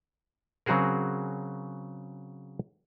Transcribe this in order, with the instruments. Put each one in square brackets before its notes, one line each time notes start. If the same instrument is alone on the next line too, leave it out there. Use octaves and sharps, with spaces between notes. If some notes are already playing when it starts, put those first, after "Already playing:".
[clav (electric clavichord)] C#3 F#3 C4 F#4 G#4 A#4